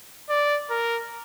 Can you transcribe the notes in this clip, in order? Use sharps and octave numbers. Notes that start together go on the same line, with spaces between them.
D5
A#4